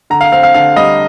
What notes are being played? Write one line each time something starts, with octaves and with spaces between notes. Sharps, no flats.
D3 A#5
F5
C4 F5
F5
D3 F5
G3 D#5